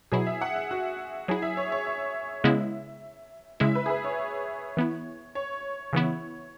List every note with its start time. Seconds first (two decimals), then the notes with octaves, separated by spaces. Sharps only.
0.12 B2 F#3 E4 G#4
0.26 E5
0.41 F#5
0.56 E5
0.71 F#4
1.28 F#3 E4 G#4
1.42 E5
1.57 C#5
1.72 C#5
1.86 E5
2.44 C#3 G#3 B3 E4
3.60 C#3 G#3 E4 E5
3.75 B4
3.86 G#4
3.90 B4
4.04 C#5
4.77 E3 B3 E4
5.35 C#5
5.93 C#3 E3 B3 E4